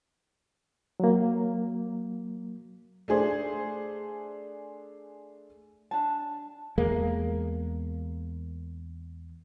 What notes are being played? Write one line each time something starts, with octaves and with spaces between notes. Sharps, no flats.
F#3 A#3
A3 D4 G#4 C5
D4 A5
E2 G#3 A#3